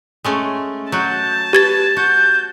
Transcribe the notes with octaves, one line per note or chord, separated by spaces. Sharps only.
G#3 A3 C#4
F#3 F#4 A5 G6
G4 B4 G#6 A6
F#4 G6